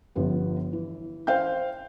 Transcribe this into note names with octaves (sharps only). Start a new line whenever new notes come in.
G1 F3 B3 G4
E3
C5 F5 G5 G6